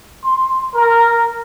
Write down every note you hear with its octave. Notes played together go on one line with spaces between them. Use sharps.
C6
A#4